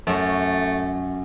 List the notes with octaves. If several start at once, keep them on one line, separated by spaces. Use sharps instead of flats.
F#2 A3 C#5